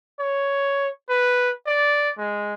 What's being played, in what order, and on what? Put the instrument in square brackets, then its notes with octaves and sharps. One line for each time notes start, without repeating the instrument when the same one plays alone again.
[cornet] C#5
B4
D5
G#3